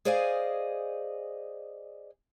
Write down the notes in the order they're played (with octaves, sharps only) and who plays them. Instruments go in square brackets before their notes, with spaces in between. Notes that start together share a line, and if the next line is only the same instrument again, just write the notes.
[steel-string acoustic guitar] G#4 C5 D5 D#5 F5 G#5